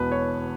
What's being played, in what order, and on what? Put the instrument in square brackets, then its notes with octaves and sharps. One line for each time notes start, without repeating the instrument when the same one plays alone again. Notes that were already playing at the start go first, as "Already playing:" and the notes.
Already playing: [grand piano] E1 E2 B2 B4
C#5